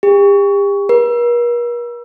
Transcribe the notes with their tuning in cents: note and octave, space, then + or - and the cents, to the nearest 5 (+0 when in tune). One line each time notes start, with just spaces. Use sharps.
G4 +40
A#4 +45